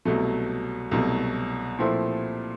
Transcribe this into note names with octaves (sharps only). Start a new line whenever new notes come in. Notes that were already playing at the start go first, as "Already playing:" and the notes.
C2 B2 F#3 A3
C2 B2 F#3 A3
A#2 F3 A3 C4 E4